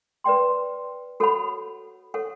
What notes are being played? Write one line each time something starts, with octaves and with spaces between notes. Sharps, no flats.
B4 D5 G5 C6
F#4 A4 C#5 F#5 B5
A4 C#5 F#5